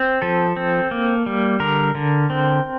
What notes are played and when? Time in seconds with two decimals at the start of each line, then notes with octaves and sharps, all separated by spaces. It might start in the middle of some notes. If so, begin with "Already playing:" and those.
Already playing: C4
0.22 F3 A4
0.56 C4
0.91 A#3
1.26 G3
1.60 D3 A#4
1.95 D3
2.30 C4